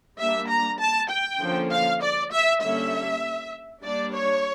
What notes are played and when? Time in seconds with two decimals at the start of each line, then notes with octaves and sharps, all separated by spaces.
0.19 G3 A#3 D4 E5
0.49 A#5
0.80 A5
1.10 G5
1.40 D3 F3 A#3 C#4
1.71 F5
2.02 D5
2.31 E5
2.62 D3 G3 A#3 C#4 E5
3.83 G3 A#3 D4 D5
4.14 C#5